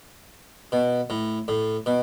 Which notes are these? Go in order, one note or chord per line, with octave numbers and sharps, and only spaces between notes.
B2
A2
A2
B2